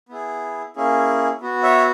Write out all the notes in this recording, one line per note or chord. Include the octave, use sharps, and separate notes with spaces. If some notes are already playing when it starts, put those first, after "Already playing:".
B3 E4 G#4
A#3 C#4 E4 G#4
B3 F#4
C#5 E5